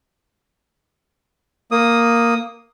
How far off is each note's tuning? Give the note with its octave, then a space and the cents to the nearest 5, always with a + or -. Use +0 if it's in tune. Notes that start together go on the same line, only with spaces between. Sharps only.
A#3 +0 D#6 +0